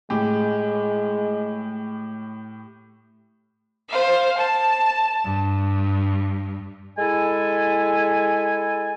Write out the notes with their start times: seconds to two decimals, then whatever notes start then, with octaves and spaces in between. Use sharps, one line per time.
0.10 A2 G#3 G4
3.89 C5 F5
4.37 A5
5.23 G2
6.98 G#3 E4 A4 G#5